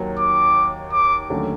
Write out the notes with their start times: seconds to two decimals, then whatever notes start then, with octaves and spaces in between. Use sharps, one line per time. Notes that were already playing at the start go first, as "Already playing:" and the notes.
Already playing: D#2 D#3 F#3
0.19 D6
0.92 D6
1.30 D#2 D3 F#3 A3 C#4